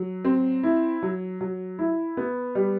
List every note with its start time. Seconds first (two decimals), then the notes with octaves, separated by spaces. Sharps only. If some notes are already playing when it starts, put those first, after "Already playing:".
Already playing: F#3
0.25 C4
0.63 E4
1.02 F#3
1.41 F#3
1.79 E4
2.17 B3
2.55 G3